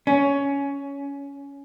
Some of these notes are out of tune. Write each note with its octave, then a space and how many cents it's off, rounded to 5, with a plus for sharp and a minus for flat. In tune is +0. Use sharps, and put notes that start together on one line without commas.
C#4 +15